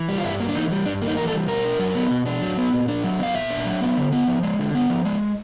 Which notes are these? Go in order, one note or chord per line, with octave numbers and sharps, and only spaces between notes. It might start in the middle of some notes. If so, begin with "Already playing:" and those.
Already playing: E3
G3
F4
G2 E4
A#3
D4
E3 D#4
G3
G2 D4
A#3
D#4
E3 A#4
A4
G3
B2 A#4
D4
F#3
B3
B2
D4
F#3
B3
A#2
D4
F#3
B3 F5
A#2 E5
D4
F#3
B3
D3
B3
F3
G#3
D3
B3
F3
G#3